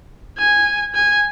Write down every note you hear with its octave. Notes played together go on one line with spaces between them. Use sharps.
G#5
G#5